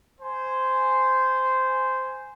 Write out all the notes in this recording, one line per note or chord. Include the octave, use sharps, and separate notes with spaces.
C5 G#5